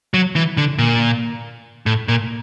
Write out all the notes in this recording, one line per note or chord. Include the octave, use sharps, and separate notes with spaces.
F#3
E3
D3
A#2
A2
A#2